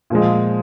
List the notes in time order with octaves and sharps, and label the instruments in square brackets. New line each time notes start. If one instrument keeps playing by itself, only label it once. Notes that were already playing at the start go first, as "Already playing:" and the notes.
[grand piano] A#2 F3 G#3